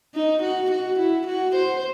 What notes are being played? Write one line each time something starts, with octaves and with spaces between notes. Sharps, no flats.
D#4
F#4
F#4
E4
F#4
C5